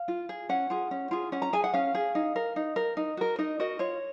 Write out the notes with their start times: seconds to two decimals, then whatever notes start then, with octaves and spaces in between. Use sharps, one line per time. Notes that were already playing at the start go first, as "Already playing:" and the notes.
Already playing: F5
0.08 F4
0.29 G#4
0.49 C#4 F#5
0.70 F4 G#4
0.91 C#4
1.11 F4 G#4
1.32 C#4 F#5
1.42 A#5
1.53 G#4 G#5
1.64 F#5
1.73 C#4 F5
1.95 G#4
2.15 D#4
2.36 A#4
2.56 D#4
2.76 A#4
2.97 D#4
3.17 F#4 A#4
3.39 D#4 D#5
3.60 F#4 A#4 D#5
3.79 F4 C#5